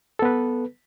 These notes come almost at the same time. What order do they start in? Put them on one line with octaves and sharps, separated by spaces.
A4 B3 B4